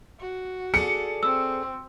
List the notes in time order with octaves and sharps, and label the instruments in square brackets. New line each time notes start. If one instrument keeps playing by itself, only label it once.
[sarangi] F#4
[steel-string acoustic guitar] G#4 A4 D5 [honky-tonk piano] C#7
[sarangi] C4 [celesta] E6